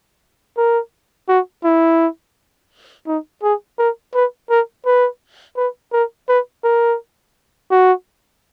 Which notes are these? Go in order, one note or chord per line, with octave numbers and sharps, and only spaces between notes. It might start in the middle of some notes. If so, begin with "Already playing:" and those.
A#4
F#4
E4
D#4
G#4
A#4
B4
A#4
B4
B4
A#4
B4
A#4
F#4